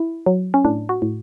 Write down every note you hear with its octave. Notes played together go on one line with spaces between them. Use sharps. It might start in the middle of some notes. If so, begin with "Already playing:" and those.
Already playing: E4
F#3
C#4
A2 D4
F#4
A2